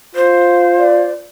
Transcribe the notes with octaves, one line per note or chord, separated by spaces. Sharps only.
F4 C5
D5